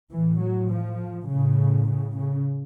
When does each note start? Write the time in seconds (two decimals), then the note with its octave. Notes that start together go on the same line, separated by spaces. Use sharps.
0.13 A2 E3
0.41 F#3
0.71 F3
1.29 A2 C#3
1.87 C#3
2.17 C#3